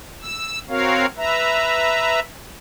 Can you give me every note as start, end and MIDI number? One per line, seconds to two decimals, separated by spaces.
0.22 0.59 88
0.69 1.06 60
0.69 1.06 66
0.69 1.06 70
0.69 1.06 73
0.69 1.06 77
1.17 2.20 71
1.17 2.20 76
1.17 2.20 82